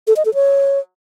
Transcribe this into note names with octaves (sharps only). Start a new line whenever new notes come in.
A4
D#5
A4
C#5